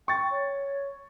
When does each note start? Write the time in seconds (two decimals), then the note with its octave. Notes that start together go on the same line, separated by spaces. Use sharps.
0.08 G5 C#6 A6
0.31 C#5